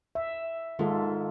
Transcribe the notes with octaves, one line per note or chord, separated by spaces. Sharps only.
E5
G#2 D#3 F4 A4